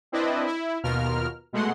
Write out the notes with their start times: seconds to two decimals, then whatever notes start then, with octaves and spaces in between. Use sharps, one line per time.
0.12 C4 D4 E4 B4 D5 D#5
0.46 E4
0.83 D#2 B2 F4 A#4 F6
1.53 B2 G#3 A3 F#5 C6